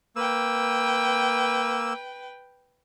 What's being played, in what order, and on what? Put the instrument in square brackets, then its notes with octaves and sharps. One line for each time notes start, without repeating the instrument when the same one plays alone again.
[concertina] A#3 E6 [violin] B4 G5